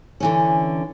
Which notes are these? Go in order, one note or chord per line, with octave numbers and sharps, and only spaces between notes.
D3 E3 C#4